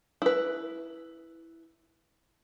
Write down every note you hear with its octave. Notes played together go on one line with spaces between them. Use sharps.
E4 B4